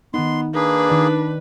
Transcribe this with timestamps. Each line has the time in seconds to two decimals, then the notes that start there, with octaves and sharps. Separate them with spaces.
0.14 D#3 B3 D#4 C6
0.55 A#3 D4 G#4 B4
0.89 D#3 D5